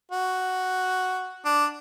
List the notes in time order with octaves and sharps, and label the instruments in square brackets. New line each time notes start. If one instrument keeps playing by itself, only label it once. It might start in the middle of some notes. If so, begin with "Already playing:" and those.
[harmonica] F#4
D4